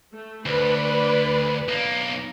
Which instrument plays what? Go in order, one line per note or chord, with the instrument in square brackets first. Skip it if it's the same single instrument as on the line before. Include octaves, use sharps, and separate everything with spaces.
[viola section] A3
[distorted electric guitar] D2 [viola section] B4 D5 B5
[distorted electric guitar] B1 A#3